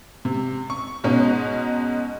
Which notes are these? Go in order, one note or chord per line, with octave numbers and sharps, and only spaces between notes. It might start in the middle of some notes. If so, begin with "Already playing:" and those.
C3
C#6
G#2 B2 C#4 D#4